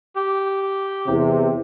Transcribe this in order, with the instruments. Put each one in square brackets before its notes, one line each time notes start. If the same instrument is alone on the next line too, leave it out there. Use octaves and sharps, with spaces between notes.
[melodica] G4
[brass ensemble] E2 C3